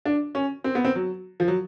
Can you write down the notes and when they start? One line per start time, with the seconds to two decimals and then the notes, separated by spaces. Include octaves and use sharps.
0.05 D4
0.35 C#4
0.64 C4
0.75 B3
0.85 C4
0.95 F#3
1.40 F3
1.48 F#3